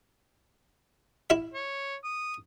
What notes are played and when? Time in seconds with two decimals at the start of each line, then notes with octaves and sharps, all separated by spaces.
1.30 E4 E5
1.54 C#5
2.04 D#6